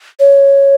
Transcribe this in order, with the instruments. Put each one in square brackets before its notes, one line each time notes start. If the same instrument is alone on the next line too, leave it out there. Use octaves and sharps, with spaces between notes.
[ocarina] C#5